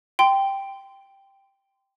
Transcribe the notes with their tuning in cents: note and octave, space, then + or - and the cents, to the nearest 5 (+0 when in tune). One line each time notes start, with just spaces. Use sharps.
G5 +0 C6 -20